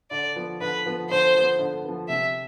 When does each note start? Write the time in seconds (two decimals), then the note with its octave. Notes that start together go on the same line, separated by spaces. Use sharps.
0.11 D3 D5
0.36 F3 B3
0.61 D3 B4
0.85 F3 B3
1.10 D3 C5
1.34 F3 B3
1.59 D3
1.85 F3 B3
2.08 C3 E5